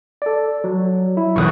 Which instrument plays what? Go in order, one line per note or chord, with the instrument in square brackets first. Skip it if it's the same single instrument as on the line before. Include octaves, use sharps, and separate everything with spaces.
[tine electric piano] A4 D5
F#3
F#3 E4
[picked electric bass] B1 E2 B2 [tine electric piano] C#6 D#6 F#6